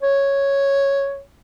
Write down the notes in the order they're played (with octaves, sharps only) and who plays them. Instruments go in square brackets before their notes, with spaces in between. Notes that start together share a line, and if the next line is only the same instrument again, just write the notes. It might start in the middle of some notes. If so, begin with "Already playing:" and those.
[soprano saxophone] C#5